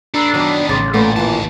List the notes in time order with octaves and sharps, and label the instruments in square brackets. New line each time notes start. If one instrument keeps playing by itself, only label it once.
[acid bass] D4 [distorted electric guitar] A4 B4 [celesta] A#5 E6 C7
[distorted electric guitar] D#3 B3 [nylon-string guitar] F#3
[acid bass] A1 [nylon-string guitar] C#3 [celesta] C6 D6 A6
[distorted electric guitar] A#2 [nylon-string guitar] A3 B3 C#4
[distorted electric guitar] D#2 A5 [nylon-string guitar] A#2 D#3 E3